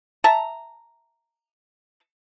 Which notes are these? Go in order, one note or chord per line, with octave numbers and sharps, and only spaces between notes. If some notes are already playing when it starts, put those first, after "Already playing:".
E5 A5 A#5